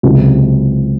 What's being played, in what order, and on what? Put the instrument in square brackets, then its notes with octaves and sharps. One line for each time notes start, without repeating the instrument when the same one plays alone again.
[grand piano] C#2 C3 F#3